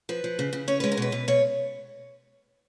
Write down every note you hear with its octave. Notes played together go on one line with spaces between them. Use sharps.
F3 B4
F3
C#3
C#3
C#4 C#5
G#3 B4
A#4
B2 B4
B2
B2 C#5